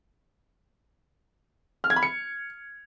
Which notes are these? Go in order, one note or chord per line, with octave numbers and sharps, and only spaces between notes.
F6
G#6
B5
C#7